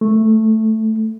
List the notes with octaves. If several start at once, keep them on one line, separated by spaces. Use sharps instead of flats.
A3